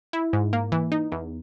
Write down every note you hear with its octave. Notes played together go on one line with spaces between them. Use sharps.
E4
G#2
A#3
E3
D#4
E2